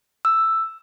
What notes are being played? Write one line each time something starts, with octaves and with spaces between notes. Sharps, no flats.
E6